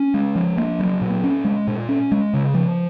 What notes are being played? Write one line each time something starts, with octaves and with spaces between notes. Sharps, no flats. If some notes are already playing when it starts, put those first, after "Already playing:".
Already playing: C#4
G#3
F3
A#3
F#3
A#2
C#4
G#3
A#2
C#4
G#3
C#3
F3